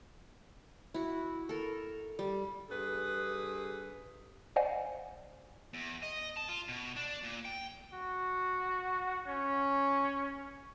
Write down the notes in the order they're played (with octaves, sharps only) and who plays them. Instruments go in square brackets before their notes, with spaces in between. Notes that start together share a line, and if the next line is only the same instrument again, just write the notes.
[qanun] E4 F#4
A4 A#4
G3
[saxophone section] G2 G#4 A4 B4
[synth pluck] C5 D5 D#5 F5 F#5 G#5
[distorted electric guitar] E2
D#5
A5
F4
B2
D4
A#2
G5
[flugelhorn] F#4
C#4